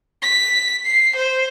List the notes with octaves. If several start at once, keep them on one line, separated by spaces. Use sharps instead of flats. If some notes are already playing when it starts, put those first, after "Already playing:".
B6
C7
C5